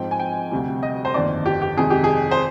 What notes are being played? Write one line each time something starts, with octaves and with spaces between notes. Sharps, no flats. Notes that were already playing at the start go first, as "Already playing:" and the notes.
Already playing: G#2 F3 C4 G5
G#5
G5
D2 C3 G3
D#5
C5
G1 F2 D#3 A#3 D5
G4
G4
F2 C3 D#3 G#3 G#4
G4
G#4
C5